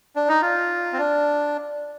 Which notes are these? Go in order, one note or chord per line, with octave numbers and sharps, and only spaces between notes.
D4
D#4
F4
C4
D4